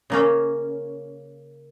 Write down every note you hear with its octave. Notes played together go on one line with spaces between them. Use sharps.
C#3 A#3 C#4